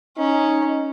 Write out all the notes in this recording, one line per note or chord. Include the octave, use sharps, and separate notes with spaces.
C#4 D#4